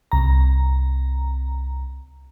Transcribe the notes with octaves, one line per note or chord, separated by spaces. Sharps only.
C2 A#5